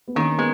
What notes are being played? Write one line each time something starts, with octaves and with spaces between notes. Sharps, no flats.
B3
D#3 A#3 C#4
G#3 B3